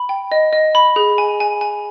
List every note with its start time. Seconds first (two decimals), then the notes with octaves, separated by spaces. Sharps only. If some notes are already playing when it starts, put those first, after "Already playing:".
Already playing: B5
0.09 G5
0.32 D#5
0.53 D#5
0.75 B5
0.96 G#4
1.18 G#5
1.40 G#5
1.61 G#5